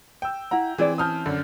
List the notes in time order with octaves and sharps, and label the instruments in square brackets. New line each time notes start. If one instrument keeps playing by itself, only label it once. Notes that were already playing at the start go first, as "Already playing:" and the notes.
[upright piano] G5 E6
[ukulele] E4 F#5 [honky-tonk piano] A#5
[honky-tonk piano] E3 C4 [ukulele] G#4 D5
[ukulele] C#4 A5 [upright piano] D#6 F6 G6
[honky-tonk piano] F#2 [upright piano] D3